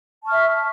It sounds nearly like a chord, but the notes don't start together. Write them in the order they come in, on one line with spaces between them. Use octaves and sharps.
A5 C#6 F6 E5